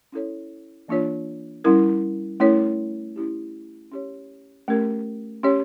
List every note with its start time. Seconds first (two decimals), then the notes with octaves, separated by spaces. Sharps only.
0.12 C#4 E4 A4 C#5
0.88 E3 A#3 D4 F4 C#5
1.64 G3 C#4 E4 A#4
2.40 A3 C#4 E4 A#4 C#5
3.16 C#4 E4 G4
3.92 C#4 G4 C#5
4.68 A3 C#4 G4 A#4
5.43 C#4 G4 C#5